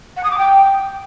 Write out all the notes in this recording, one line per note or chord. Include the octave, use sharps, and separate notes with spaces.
F#5
D#6
D6
G5